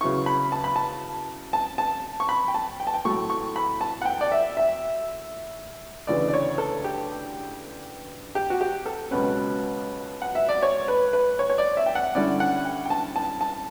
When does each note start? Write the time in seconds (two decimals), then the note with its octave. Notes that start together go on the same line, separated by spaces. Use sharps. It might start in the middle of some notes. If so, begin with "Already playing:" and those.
0.01 C#3 F#3 B3 E4 C#6
0.26 B5
0.52 A5
0.64 B5
0.76 A5
1.53 A5
1.78 A5
2.20 C#6
2.29 B5
2.48 G5
2.54 A5
2.80 G5
2.87 A5
2.94 G5
3.05 A2 F#3 A3 C#6
3.30 C#6
3.56 B5
3.81 A5
4.02 F#5
4.05 G5
4.21 D5
4.32 E5
4.57 E5
6.07 D2 C#3 E3 B3 D5
6.28 D5
6.33 C#5
6.58 A4
6.84 G4
8.35 G4
8.50 F#4
8.61 G4
8.86 A4
9.11 C#2 B2 F#3 C#4 B4
10.22 F#5
10.35 E5
10.49 D5
10.63 C#5
10.88 B4
11.13 B4
11.39 C#5
11.50 C#5
11.58 D5
11.77 E5
11.86 G5
11.95 F#5
12.15 G2 D3 G3 C#4 E4 D5
12.40 F#5
12.65 G5
12.85 G5
12.90 A5
13.16 A5
13.41 A5